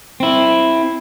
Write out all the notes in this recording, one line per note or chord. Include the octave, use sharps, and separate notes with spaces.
C4 E4